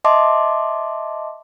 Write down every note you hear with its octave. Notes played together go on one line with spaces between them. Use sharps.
D#5 E5 A5 C6 D6